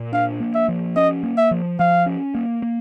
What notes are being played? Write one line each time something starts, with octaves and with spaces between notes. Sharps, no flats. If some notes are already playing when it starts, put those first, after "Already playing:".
Already playing: A#2
D4 F5
A#3
E5
F3
C#4 D#5
A#3
E5
F3
F3 F5
C#4
A#3
A#3